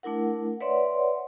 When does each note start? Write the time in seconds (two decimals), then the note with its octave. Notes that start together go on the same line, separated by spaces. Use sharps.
0.03 A3 D4 E4 A#4 F#5
0.61 B4 C#5 D5 E5 F#5 C6